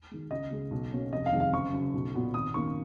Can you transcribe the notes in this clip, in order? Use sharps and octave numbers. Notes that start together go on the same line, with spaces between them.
D#3 G#3
C#2 D#5
C#3 G#3
B1
B2 A#3 C#4
F1 D#5
F5
F2 D#3 G#3
F5
F#1 C#6
F#2 C#3
B1
A#2 F#3 B3
G#1 D#6
F#2 D#3 A#3 C#6